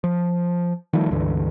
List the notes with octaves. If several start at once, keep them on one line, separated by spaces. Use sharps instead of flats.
F3
D#3 F3 G3 A3
C#2 G2 D3 E3